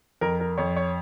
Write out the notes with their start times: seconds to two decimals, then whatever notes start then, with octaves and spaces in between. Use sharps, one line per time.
0.21 F2 A#4
0.40 A#4
0.58 F2 C#5
0.76 C#5